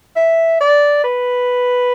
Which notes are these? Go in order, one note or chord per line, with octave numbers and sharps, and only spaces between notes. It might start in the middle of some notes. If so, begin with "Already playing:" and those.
E5
D5
B4